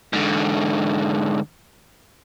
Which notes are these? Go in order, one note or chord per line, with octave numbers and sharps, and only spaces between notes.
G#2 D3